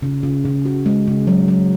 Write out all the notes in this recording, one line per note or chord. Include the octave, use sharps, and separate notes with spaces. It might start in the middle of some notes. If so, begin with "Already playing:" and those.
C#3
C#3
C#3
F#4
G#3
C#3
F#3
F#3